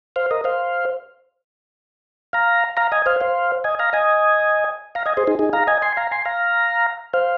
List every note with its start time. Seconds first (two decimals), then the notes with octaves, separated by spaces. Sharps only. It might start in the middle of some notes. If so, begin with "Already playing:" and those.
0.16 C5 F5
0.31 A#4 D#5
0.44 C5 F5
2.33 F5 A#5
2.77 F5 A#5
2.92 D#5 G#5
3.06 C5 F5
3.21 C5 F5
3.64 D#5 G#5
3.79 F5 A#5
3.93 D#5 G#5
4.95 F5 A#5
5.06 D#5 G#5
5.17 G#4 C5
5.27 D#4 G#4
5.39 D#4 G#4
5.53 F5 A#5
5.67 D#5 G#5
5.82 G#5 C6
5.97 F5 A#5
6.11 G#5 C6
6.25 F5 A#5
7.14 C5 F5